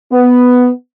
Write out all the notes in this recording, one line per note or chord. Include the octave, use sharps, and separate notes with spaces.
B3